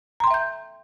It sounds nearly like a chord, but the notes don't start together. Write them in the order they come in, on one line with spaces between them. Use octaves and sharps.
A#5 C6 G5 E5 G6